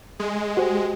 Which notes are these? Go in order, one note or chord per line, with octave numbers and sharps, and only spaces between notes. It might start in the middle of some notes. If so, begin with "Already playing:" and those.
G#3
F#4 G4 C5